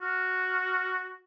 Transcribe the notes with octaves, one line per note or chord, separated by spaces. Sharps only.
F#4 F6